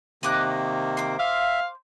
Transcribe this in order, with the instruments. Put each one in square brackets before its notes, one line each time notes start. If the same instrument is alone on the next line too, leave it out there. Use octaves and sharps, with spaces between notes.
[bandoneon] C3 D#3 A#3 [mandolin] D#5 D6 F#6
[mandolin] C5 D6
[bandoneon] E5 [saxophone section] F5